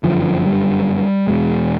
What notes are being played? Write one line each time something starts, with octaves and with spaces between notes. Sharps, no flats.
G1 F#2 D3 F3
F3
G3
E1 E2 B2 G#3